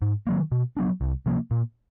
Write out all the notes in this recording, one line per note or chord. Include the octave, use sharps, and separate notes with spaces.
G#2
D#3 F#3 A#3
B2
F#3 B3 D4
C2
C3 F3 A#3
A#2